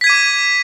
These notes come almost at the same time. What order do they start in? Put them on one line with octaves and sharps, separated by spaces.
B6 G#6 D#7 D6